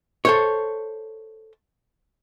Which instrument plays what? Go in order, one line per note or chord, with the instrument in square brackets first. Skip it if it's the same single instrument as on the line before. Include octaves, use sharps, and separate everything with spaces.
[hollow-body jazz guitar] A4 C5 C#5